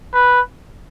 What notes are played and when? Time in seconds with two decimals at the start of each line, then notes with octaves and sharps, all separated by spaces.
0.14 B4